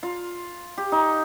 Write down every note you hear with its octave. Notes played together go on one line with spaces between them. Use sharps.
F4
G4
D#4